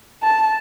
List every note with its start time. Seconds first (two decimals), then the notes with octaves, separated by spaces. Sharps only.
0.23 A5